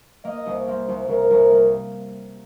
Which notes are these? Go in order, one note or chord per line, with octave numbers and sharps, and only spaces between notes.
A#3 D#5
C2
A#3 C5
C2
C2 A#4
C2
A#3